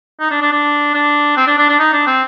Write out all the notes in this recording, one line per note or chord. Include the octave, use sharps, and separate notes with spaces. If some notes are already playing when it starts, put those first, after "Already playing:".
D#4
D4
D4
D4
D4
C4
D4
D4
D4
D#4
D4
C4